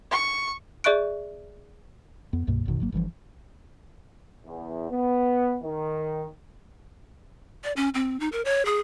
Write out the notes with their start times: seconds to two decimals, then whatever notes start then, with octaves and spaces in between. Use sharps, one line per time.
0.11 C#6
0.84 G#4 D5 E5 C#6 F#6 D7
2.33 F2 B3
2.47 C2 G2 B2 A#3
2.66 A1 F#2 B2 D#3
2.80 G#1 F#3 A#3
2.92 G1 G2 E3 F3
4.45 E2
4.89 B3
5.62 D#3
7.64 D5
7.76 C#4
7.94 C4
8.20 D#4
8.32 A#4
8.45 C#5
8.66 G#4